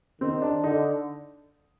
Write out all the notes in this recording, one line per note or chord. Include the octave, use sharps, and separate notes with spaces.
D#3 C4
D4
D3 D#4